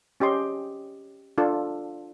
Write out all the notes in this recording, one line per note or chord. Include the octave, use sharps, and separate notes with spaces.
C#4 G4 D#5 C6
D4 F4 A4